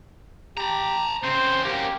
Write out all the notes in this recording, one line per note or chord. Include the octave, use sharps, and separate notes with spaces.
G4 A#5 B5
C#3 C4 C5
F#2 A#3 G4